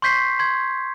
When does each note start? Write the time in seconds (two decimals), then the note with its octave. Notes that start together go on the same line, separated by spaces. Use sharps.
0.02 C6 C#6 G6 B6 C7
0.39 C6 G#6